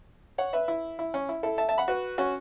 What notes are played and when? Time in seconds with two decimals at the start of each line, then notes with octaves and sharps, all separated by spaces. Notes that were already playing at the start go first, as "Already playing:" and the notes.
0.38 C#5 F#5
0.53 B4 E5
0.68 E4
0.99 E4
1.14 C#4
1.29 E4
1.43 E4 A4
1.58 E5 A5
1.69 E5 A5
1.78 F#5 B5
1.88 F#4 B4
2.18 C#4 F#4